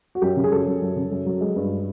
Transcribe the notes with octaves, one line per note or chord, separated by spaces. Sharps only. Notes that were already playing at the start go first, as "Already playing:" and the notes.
F#4
F#2 G4
C#3
G#4
F#2 A4
F#3
F#2
C#3
F#2
F#3
G#3
G2